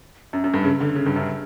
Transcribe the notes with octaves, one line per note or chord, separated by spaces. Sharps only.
F#2
F#2
G2
C#3
D3
C#3
G2
F#2